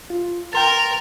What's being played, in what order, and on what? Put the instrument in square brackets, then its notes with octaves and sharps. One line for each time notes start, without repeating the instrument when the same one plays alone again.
[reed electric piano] F4
[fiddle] A#4 [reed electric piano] G5 C6 A6